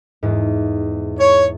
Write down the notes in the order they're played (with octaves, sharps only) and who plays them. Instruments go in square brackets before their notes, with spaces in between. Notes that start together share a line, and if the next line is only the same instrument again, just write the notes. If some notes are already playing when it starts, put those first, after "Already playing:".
[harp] E2 G#2
[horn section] C#5